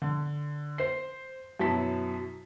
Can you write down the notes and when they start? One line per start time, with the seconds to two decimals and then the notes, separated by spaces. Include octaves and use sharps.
0.02 D3
0.78 C5 C7
1.59 F#2 B2 F#3 E4 A5 B6